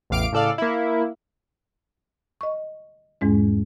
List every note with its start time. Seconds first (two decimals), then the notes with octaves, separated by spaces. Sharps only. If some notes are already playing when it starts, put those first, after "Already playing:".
0.10 A1 E2 A2 F5 D6 D7
0.33 A2 C#3 A4 D5 F5
0.58 A#3 E4
2.41 D#5 C#6
3.21 E2 G#2 G#3 C#4